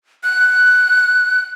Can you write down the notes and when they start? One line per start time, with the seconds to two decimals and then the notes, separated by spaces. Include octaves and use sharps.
0.24 F#6